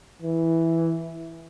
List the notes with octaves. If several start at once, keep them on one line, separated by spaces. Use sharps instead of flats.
E3